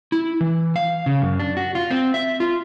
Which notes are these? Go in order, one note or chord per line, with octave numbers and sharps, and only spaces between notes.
E4
E3
F5
C#3
F#2
D4
F#4
F4
C4
E5
F4